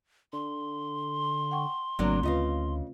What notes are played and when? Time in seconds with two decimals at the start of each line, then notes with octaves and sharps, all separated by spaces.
0.33 D3 C6
1.51 F#5 G5 C#6
1.99 G#1 C#3 F#3 A3 A#3 C4 D4
2.23 D2 C#3 F4 B4 D#5 F5